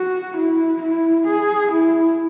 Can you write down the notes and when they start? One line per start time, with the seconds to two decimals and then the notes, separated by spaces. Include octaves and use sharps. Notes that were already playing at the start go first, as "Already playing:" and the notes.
Already playing: F#4
0.37 E4
0.82 E4
1.27 G#4
1.72 E4